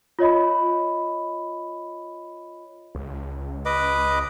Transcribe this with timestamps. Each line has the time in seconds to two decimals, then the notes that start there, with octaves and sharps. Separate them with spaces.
0.19 F4 C#5 D#5 B5
2.95 C#2
3.65 B4 D#5 D6